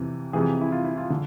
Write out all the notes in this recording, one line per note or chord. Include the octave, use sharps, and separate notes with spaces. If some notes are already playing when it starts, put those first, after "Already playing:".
Already playing: F2 C3 E3
F2 C3 E3 G#4
E4
F4
E4
F4
D3